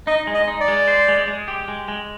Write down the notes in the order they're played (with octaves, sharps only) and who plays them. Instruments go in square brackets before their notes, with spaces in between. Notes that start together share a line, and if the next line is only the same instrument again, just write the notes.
[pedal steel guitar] D#4 [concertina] D#5
[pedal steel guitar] G#3
[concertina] D#5
[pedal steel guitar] D#4
[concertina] D5
[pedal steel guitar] G#3
C5
G#3
G#3
G4
G#3
G#3